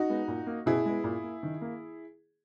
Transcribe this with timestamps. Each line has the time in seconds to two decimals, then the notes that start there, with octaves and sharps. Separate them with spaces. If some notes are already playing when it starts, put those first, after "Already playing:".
Already playing: D#4 F#4
0.10 G#3 B3
0.28 A#2
0.47 A#3
0.66 B2 E4 G#4
0.86 G#3 B3
1.04 A#2
1.23 A#3
1.43 D#3
1.61 A#3